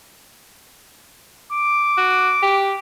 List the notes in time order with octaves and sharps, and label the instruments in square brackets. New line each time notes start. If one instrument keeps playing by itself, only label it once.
[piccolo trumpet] D6
[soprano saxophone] F#4
G4